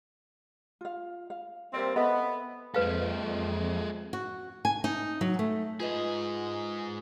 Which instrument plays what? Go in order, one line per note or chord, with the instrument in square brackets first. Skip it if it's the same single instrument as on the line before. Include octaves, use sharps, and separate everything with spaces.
[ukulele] F4 F5
F5
[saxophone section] G3 A#3 C4 [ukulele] D5 E5
[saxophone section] B3 [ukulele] A4 D#5 E5
[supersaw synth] F2 [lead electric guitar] G#3 A4 [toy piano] B4 F5
[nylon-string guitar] F#4
G#5
D#4
F#3
A3
[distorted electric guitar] G#2 G#4 [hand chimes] F4 B4 D#5